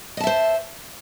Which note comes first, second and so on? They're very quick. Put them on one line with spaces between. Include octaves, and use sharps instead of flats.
D#5 A5 E5 C5